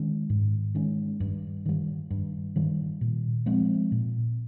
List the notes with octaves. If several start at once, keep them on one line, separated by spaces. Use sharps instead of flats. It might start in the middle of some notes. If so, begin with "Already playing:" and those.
Already playing: D#3 G#3 C#4
G#2
D#3 G#3 C#4
G2
D#3 G3
G2
D#3 G3
A#2
F3 G#3 C4
A#2